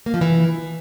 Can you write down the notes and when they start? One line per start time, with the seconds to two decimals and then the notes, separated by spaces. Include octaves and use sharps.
0.06 A#3
0.14 F3
0.21 E3